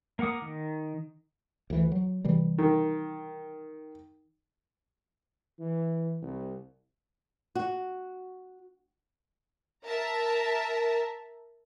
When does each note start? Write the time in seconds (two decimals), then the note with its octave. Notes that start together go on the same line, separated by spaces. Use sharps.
0.19 A#3 A#4 F#5 D6 D#6
0.42 D#3
1.70 D2 E3
1.92 F#3
2.25 C3 E3 G3
2.58 D#3
5.59 E3
6.22 C2
7.55 F#4
9.85 A#4 E5 A5 A#5